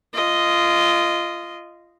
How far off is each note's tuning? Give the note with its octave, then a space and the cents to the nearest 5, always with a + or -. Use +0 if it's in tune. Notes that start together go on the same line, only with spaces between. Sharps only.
F4 -20 D#5 +0